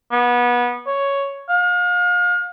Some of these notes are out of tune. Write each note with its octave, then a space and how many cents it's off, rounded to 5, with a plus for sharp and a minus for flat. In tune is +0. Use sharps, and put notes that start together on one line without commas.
B3 -25
C#5 +5
F5 +35